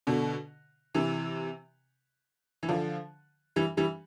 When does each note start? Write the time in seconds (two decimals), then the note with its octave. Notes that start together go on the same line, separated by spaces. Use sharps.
0.07 B2 D3
0.94 C3 E3
2.63 E3
2.68 D3 F3
3.56 E3 G3
3.77 E3 G3